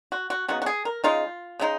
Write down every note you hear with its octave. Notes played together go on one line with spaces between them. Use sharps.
F#4
F#4
C#3 F#3 B3 D#4 F#4
F#4
G#4
A#4
C#3 G#3 D#4 F4
C#3 G#3 D#4